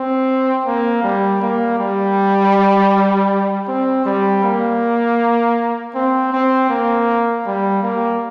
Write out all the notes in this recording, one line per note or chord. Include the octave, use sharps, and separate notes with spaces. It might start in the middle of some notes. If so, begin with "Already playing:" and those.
Already playing: C4
A#3
G3
A#3
G3
C4
G3
A#3
C4
C4
A#3
G3
A#3